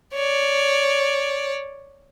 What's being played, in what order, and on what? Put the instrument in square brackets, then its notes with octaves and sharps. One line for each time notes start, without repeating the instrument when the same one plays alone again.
[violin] C#5 D5